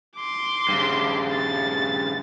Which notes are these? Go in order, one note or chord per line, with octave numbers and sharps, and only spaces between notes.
C6 D6
G2 C#3
A6